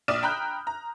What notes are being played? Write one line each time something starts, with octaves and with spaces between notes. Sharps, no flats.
A#1 D5 D#6 F6 E7
G5 A#5 B5 F#6 G6
A#5